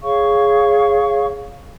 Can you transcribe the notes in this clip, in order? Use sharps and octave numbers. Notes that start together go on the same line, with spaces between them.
G#4 C#5 F5 C#6